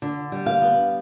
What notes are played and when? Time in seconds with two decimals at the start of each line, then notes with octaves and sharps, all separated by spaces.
0.02 D3
0.32 G3
0.46 F5
0.62 B3